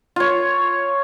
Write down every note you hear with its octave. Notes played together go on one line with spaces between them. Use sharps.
F4 C#5